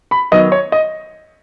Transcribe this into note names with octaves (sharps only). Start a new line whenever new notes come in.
B5
D#3 F#3 B3 D#5
C#5
D#5